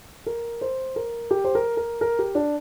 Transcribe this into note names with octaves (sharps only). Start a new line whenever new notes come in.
A#4
C5
A#4
G4
C5
A#4
A#4
A#4
G4
D4